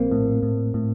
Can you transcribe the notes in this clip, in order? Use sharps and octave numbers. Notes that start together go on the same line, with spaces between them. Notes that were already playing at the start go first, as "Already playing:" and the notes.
Already playing: A#1 A#3 C4
A2
A2
A2